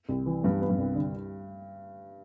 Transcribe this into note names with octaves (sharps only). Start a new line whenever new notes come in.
C2
E3
G2 B3
B3
G2
C2
D3